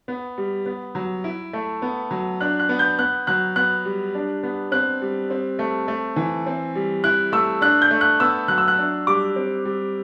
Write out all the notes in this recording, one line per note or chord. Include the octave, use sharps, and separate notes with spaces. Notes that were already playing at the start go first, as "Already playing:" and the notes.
B3
G3
B3
F#3
E4
A3
B3
F#3
D4 F#6
F#6
B3
G6
B3 F#6
F#3 F#6
B3 F#6
G3
D4
B3
C4 F#6
G3
C4
A3
A3
E3
C4
G3
E4 F#6
A3 E6
D4 F#6
G6
A3
F#6
B3 E6
F#3 F#6
E6
F#6
D4
G3 D6
C4
G3